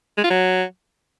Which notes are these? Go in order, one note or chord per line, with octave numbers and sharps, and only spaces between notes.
G#3
F4
F#3